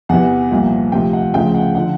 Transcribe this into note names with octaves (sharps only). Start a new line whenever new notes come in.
E2 C3 E3 F#5
C2 A#2 F3
D2 C3 F3 G5
F#5
D2 C#3 F3 G5
F#5
D3 F3 F#5